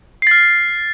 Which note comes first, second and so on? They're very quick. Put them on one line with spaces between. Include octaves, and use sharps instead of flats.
C7 A6 F6